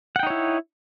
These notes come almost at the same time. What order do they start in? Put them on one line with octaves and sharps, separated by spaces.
F#5 G5 D#4 C#5 E4